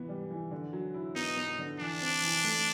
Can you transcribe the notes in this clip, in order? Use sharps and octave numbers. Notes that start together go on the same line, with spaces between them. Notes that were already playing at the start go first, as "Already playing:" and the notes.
Already playing: E3 B3
G3
E3
D3
F#3
E4
B3 D#4
B3
D3
E3 D4
C4
E3
A3